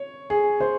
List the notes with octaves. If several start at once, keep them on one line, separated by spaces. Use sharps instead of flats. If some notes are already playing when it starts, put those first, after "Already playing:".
Already playing: C#5
G#4
C5